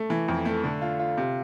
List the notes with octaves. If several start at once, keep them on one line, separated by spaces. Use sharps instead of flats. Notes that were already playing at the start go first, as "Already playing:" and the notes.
Already playing: A3
E3
F2
A3
D3
F4
F4
C3